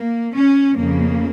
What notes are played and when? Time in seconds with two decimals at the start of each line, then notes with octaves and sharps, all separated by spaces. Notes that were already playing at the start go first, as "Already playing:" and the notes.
Already playing: A#3
0.35 C#4
0.76 F2 C#3 A#3